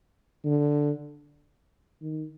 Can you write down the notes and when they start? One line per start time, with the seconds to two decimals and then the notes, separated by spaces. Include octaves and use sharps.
0.45 D3
2.02 D#3